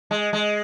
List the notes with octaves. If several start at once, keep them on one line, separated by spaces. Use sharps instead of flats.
G#3
G#3